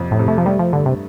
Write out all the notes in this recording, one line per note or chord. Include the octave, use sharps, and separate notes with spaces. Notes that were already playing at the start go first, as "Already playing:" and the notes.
Already playing: F2 C3
A2
C3
A3
F3
G3 A3
F3
G2 D3
C3